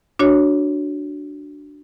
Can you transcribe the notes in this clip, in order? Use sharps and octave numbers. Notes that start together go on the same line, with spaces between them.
D4 F#4 C#5